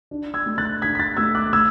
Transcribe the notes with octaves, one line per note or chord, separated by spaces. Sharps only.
D4
E6 G#6
A3
F#6 A6
D4 G#6 B6
B6
F#6 A6
A3 E6 G#6
D6 F#6
A3 E6 G#6